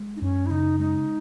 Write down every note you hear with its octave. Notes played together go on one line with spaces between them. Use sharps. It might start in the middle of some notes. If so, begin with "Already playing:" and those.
Already playing: G#3
D#4
F#2 C#4
E4
C#3 D#4
G#3 D#4